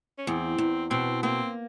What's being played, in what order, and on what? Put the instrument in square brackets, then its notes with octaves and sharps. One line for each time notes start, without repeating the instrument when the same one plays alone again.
[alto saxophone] C#4
[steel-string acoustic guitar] E2 [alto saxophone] C4
[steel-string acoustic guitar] E2
[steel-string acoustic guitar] B2 [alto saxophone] C4
[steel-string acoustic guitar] A#3 [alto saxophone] C4